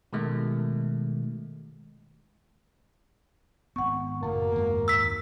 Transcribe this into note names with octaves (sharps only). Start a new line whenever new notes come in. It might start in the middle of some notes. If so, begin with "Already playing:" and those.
B2 D#3 G#3 A3
G#1 B3 F#5 C#6
F#2 A2 C#3 A#3 B3
D#2 G#2 G#3
E6 B6